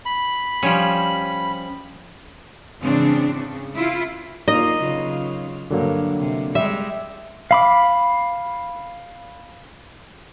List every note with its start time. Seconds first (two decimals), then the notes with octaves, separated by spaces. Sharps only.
0.06 B5
0.63 F3 G3 C#4
2.79 G#2 C#3 E3 C4 D4
3.31 C#3
3.73 E4 F4
4.48 A#3 D#4 F4 A#4 D#5
4.79 C#3 F#3 F4
5.71 G2 D3 F#3 A#3
6.18 C3
6.55 G3 G#3 E5
7.51 F5 B5 D6